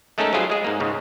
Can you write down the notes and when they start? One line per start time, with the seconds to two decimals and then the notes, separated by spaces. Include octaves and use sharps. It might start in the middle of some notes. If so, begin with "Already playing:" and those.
0.18 G#3 A3 C#4 D#4 A4 A#4
0.33 F#3 G3 E4 F4 G#4 C5
0.50 G#3 G#4
0.64 G#2 A#3
0.80 C#2 G#2 C#3